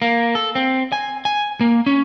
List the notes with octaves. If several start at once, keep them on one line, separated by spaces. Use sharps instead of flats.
A#3
A4
C4
G#5
G#5
A#3
C#4